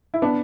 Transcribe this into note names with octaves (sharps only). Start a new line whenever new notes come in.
E4
B3 D4